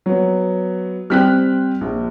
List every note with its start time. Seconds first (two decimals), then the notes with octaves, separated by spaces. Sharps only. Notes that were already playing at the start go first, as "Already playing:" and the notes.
0.06 F#3 B3
1.10 G3 C4 F6 F#6 B6
1.81 A#1